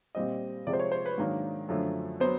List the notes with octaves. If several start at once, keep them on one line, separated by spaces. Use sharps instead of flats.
A#2 G3 C4 D#5
C3 F3 G#3 D5
C5
C#5
C5
B4
G#2 D#3 F#3 A#3 D4
F#2 D3 F3 A3
F#3 B3 C5